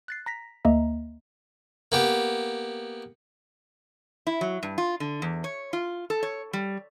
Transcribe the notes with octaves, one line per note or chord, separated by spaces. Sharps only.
F#6 A6 C7
A#5 A#6 B6
D2 A#3 D#5 E5 A#5
A#3 B3 G4
E4
F#3
G2
F4
D3
E2
C#5
F4
A4
C#5
G3